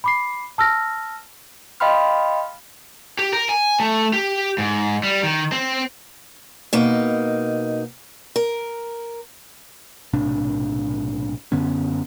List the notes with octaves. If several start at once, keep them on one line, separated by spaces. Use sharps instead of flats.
B5 D6 C7
A5 E6 F6 A#6
D#5 F5 G5 B5 C6 F6
G4
A#4
G#5
A3
G4
G#2
G3
D#3
C4
B2 A#3 D#4
A#4
B1 A2 C3 D4
F#2 D3 B3 C#4